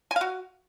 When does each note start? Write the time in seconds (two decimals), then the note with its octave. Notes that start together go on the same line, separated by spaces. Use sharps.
0.11 G#5
0.16 F5
0.21 F#4